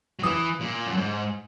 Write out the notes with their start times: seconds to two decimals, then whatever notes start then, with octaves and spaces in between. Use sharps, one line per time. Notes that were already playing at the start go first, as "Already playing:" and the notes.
0.19 F#3
0.23 E3 D#6
0.60 A#2
0.87 F#2
0.97 G#2